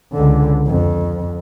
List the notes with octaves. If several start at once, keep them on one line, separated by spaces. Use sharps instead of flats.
C#2 D3
F2